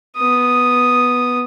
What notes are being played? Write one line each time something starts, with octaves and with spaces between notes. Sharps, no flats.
B3 D#6